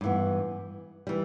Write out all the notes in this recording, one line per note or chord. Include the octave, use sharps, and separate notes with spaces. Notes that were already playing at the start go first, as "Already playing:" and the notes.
G2 E3 B3
E3 G3